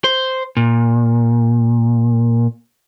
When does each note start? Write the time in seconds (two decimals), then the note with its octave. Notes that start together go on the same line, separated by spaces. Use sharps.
0.04 C5
0.57 A#2